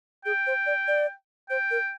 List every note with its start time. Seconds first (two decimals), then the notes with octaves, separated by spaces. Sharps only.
0.25 G#4 G5
0.47 C5
0.66 D5
0.88 D5
1.50 C5 G5
1.71 A#4